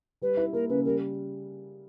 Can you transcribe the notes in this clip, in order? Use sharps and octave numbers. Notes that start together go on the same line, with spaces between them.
G3 B4
E4
A#3 A#4
C#3 B4
G3 A#4